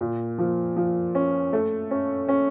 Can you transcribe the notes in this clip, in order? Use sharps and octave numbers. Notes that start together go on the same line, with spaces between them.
A#2
F3
F3
C#4
A3
C#4
C#4